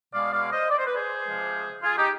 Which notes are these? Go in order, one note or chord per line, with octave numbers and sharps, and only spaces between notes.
B2 G#3 D5 F5
D5 F5
C5 D#5
D5
C5
B4
G#4 C5
C3 F3 G#3
F4 G#4
D#4 G4